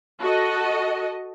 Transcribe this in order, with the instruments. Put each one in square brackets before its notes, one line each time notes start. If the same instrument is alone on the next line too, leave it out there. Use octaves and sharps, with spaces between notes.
[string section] F#4 A4 D#5